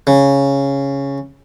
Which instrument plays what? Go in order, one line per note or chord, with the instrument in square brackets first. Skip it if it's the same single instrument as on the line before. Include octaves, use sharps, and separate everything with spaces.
[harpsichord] C#3